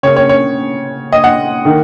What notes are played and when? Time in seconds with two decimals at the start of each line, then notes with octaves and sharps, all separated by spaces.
0.03 C#3 A#3 C#4 C#5
0.16 C#5
0.29 C#5
1.12 D#5
1.24 F#5
1.65 D#3 A#3 D#4